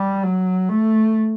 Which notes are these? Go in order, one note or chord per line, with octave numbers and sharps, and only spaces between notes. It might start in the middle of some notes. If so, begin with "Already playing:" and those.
Already playing: G3
F#3
A3